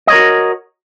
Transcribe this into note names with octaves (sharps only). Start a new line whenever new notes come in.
F#4 A#4 C#5 D#5